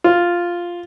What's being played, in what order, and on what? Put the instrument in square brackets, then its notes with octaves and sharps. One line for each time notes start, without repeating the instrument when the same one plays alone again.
[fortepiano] F4